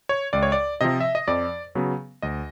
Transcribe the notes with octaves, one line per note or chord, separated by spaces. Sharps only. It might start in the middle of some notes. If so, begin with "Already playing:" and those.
C#5
C#2 D5
C#5
D5
C3 F3 D#5
E5
D#5
F2 D5
C#3 F#3 B3
D2 D#5